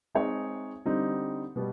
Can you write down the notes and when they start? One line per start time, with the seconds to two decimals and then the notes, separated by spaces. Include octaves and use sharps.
0.15 G#3 C4 D#4 G#4 C#5
0.85 D3 G3 C4 D#4
1.56 B2 G3 B3